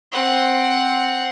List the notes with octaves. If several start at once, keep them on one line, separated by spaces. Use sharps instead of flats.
C4 F#5